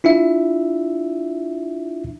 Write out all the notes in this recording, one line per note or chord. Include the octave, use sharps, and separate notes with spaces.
D4 E4 F4 E5